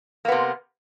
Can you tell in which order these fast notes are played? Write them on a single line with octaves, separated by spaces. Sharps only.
A#3 B3 C3